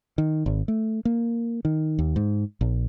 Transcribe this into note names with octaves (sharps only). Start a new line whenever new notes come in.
D#3
G#1
A3
A#3
D#3
D#2
G#2
A#1